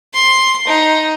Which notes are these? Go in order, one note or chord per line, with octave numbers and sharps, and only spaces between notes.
C6
D#4